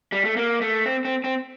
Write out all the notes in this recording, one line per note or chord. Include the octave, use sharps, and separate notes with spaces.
G3
A3
A#3
A3
C4
C4
C4